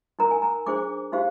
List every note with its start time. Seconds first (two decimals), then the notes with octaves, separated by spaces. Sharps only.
0.19 D#4 A#4 A#5
0.31 G#5
0.42 A#5
0.66 D4 G#4 C5 D6
1.12 D#4 G4 C5 F5